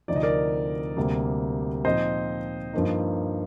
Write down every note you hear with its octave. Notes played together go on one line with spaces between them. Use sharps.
D2 C3 F3 C4 D#4 D5
D#5
A#4 D5
D2 C3 G3 A#3
A#2 F3 C4 D#4 C5 D#5
G2 F3 A#3 D#4